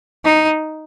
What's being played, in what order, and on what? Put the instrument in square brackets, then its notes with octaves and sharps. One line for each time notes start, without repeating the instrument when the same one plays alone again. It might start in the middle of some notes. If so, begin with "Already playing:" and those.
[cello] D#4